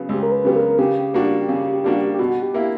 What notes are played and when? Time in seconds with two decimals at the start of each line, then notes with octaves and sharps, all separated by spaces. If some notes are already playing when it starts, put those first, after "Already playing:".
Already playing: C#3 F#3 B3
0.09 C#2 G4
0.23 A#4
0.32 B4
0.45 C#3 F#3 B3 G4
0.56 A#4
0.78 C#3 G4
1.14 G3 A#3 D4 F#4
1.49 C#3
1.84 G3 A#3 D4 F#4
2.14 G4
2.19 B2 F#4
2.43 G4
2.54 A#3 E4